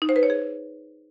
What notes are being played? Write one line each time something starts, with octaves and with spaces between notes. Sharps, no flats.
D#4
C5
B4
C#5
G#4